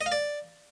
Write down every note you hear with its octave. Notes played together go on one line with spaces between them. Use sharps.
D#5
F5
D5